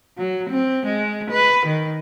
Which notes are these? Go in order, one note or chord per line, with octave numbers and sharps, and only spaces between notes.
F#3
C4
G#3
B4
D#3